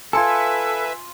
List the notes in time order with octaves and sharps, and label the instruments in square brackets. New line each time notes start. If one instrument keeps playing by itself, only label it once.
[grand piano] F4 C6 C#7 [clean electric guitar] A4 [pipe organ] B4 E5 [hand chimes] G#5 G#6